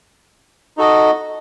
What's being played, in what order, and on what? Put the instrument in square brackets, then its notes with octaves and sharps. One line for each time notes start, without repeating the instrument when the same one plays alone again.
[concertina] D#4 F#4 A4 D#5